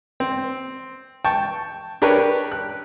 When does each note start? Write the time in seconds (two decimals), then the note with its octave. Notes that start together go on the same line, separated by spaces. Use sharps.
0.20 C4
1.25 G5 A5 C#6
2.02 D4 G4 A#4 B4 C#5
2.52 F#6